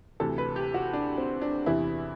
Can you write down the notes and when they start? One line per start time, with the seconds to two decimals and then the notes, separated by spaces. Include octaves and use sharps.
0.20 D2 C3 E3 A4
0.38 B4
0.56 G4
0.74 F#4
0.93 D4
1.18 C4
1.42 D4
1.66 E2 C3 E3 E4